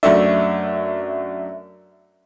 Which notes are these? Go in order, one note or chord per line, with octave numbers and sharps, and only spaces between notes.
F#2 A3 D4 E5